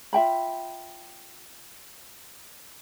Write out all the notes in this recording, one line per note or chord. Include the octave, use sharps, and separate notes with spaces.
F4 E5 G5 B5